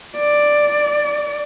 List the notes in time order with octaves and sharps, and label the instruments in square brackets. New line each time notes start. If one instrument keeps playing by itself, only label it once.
[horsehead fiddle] D5